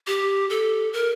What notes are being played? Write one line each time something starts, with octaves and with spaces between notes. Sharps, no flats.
G4
A4
A#4